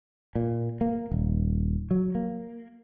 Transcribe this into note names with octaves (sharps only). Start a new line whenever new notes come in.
A#2
A#3
D#1
F#3
A#3